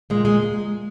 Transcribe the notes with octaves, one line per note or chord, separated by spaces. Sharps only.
A#2 G#3
G#3